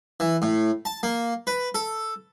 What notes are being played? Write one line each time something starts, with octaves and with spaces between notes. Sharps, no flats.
E3
A2
A5
A#3
B4
A4